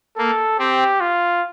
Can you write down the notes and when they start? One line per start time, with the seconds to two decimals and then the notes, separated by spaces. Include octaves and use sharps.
0.17 A#3 A4
0.59 C4 G4
1.00 F4